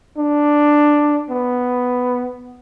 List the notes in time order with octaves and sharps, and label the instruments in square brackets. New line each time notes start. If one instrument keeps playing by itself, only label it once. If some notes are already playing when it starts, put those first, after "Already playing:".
[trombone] D4
B3